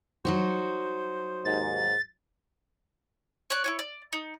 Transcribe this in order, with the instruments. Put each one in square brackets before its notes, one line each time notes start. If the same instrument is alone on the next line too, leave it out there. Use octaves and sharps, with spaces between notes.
[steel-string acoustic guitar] F#3 D#4 F#4 [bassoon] C5
[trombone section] D#2 G#2 [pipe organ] A6
[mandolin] C#5 D5 F#6
E4 F4 C#5
D5
D#4